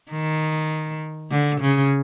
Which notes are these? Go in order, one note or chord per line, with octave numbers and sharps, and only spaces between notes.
D#3
D3
C#3